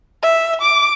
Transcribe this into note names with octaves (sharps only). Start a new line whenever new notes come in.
E5
D6